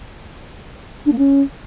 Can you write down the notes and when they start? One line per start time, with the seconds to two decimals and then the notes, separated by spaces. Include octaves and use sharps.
1.05 D4
1.11 A#3
1.18 C#4